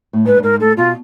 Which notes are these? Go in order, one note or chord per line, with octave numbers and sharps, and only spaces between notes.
A2
G#2 B4
G2
G#2 A#4
A2 A4
B2 F4